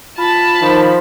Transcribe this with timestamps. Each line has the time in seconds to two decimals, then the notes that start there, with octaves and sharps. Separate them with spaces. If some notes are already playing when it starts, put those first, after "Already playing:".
0.18 F4 A5 B5
0.62 D#3 F3